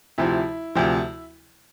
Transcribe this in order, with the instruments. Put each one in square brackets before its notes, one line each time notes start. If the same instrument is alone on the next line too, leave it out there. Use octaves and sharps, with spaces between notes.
[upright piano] D2 C3 F3 E4
D2 C3 F3